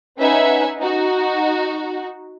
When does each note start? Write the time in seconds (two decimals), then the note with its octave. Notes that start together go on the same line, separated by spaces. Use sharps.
0.18 C#4 D#4 B4 E5 F#5 G#5
0.79 D#4 F#4